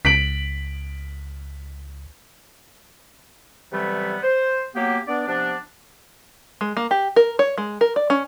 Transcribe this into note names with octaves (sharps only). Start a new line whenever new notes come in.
C#2 B6 D7 F#7
C3 E3 F#3 G3 A3 B3
C5
F#3 A#3 B3 G4
B3 D4 D5
C3 F3 B3 D4
G#3
A#3
G4
A#4
C#5
G#3
A#4
D5
C#4